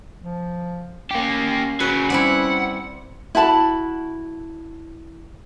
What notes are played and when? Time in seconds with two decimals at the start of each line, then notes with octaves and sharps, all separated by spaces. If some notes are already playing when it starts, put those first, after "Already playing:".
0.22 F3
1.11 A#3 C#4 G4
1.80 C#3 F#3 C#4 B4
2.10 G3 C4 E4 F#5
3.35 E4 F#4 A5 B5